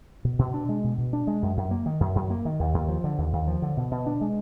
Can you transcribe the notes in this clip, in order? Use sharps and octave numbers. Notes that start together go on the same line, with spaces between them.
B2
B2
D4
G#3
B2
B2
D4
G#3
F#2
F#2
A#3
D#3
F#2
F#2
A#3
D#3
D#2
D#2
F3
D3
D#2
D#2
F3
D3
B2
B2
D4
G#3